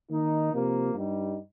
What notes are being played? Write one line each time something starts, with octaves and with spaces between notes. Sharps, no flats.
D#3 A#3 D#4
C3 F3 A#3
G2 G3 D#4